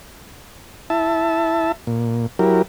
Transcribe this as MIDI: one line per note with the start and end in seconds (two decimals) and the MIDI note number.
0.90 1.72 64
0.90 1.72 76
0.90 1.72 81
1.87 2.27 46
2.39 2.62 54
2.39 2.62 64
2.39 2.62 67
2.39 2.62 70